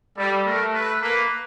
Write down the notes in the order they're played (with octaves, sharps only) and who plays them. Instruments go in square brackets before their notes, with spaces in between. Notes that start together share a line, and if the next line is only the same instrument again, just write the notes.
[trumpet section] G3 [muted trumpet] A4
[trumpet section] A3 [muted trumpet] A#4
[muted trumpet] B4
[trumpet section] A#3 [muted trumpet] B4